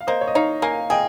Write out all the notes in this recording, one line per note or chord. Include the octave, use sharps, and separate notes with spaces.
F5
A#3 C5 D#5
C#5
D#5
D#4 C#5 F5
A#3 F5 G#5
G#4 D#5 G5